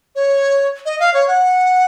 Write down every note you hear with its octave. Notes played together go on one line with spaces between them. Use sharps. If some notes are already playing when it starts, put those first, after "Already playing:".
C#5
D#5
F5
C#5
F#5